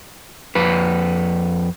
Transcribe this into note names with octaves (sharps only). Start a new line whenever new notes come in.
F2 B4